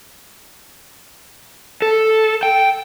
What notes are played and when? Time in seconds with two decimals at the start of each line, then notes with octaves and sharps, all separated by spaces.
1.82 A4
2.43 G5